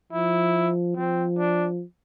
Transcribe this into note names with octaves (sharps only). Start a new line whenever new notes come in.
F3 E4
F3 C4
D4